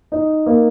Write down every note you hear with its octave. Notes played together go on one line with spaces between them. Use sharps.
D#4
A#3